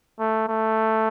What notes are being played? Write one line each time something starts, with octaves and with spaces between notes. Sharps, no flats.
A3
A3